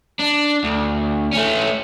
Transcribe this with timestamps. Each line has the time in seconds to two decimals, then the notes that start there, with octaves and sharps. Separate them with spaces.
0.20 D4
0.64 D2
1.33 A3 C#4